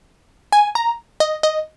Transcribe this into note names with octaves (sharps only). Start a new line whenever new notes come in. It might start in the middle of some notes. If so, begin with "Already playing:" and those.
G#5
A#5
D#5
D#5